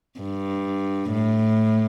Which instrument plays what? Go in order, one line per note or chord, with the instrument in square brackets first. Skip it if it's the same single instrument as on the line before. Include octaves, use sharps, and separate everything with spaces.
[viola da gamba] G2
A2